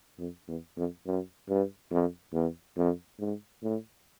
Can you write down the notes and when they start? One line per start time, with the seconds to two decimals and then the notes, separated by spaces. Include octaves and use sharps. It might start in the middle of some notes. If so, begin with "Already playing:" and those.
0.19 F2
0.48 E2
0.77 F2
1.06 F#2
1.49 G2
1.91 F2
2.33 E2
2.77 F2
3.19 G#2
3.63 A2